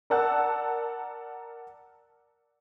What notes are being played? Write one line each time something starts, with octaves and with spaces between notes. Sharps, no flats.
A#4 D5 F#5 A5 E6 F#6